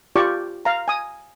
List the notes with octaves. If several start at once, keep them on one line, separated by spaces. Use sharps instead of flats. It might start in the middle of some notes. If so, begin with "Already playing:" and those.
F4 G4 D5 C#6 D6
F5 A#5
G#5 D#6